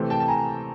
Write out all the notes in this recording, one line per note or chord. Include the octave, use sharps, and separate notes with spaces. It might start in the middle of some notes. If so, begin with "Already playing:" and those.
Already playing: C3 E3 A3 C4
G5 A5
A5
G#5 A#5